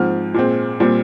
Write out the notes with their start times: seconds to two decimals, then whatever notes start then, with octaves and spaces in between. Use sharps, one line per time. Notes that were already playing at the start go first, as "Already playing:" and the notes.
Already playing: G#2 F3 C4 F6
0.34 A#2 G#3 C4
0.80 A#2 G3 C4